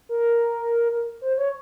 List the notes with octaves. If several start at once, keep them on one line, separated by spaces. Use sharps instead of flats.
A#4
C5
C#5